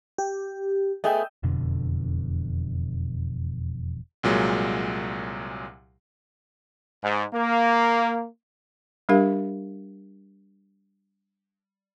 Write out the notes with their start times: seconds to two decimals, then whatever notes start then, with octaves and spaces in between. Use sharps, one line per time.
0.18 G4
1.04 A3 B3 G#4 D#5 E5 G5
1.43 E1 F2 B2 D3
4.23 C2 A#2 F#3 G#3
7.03 G#2
7.34 A#3
9.09 G3 D4 G4 A#4 F5